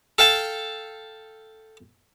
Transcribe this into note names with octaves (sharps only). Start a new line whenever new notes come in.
A4 F5 G5 A5